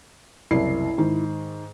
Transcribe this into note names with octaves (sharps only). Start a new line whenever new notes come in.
F#1 C2 E4 C7
G#2 D#3